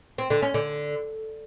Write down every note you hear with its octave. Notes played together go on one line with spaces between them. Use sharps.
C4
D3
C#4
D3